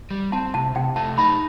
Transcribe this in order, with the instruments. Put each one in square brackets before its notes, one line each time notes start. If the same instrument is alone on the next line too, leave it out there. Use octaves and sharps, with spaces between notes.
[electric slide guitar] G3
[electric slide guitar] C4 [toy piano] A5
[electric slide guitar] C3 [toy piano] A5
[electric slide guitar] C3 [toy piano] G5
[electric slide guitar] A3 [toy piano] A5
[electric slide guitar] D#4 [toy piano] B5